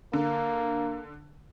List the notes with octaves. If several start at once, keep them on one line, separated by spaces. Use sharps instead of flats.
D3 A#3